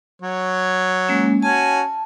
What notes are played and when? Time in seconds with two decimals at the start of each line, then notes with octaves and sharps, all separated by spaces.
0.22 F#3 C#5
1.09 G#3 A#3 C#4
1.43 C#4 F#4 G#5 A5